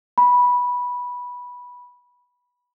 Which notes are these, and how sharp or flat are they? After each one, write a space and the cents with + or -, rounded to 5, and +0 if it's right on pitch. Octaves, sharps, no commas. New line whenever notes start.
B5 -10